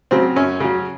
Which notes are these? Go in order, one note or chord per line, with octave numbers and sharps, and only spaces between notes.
C#3 F#3 C4
F#2 C#4
C#3 F#3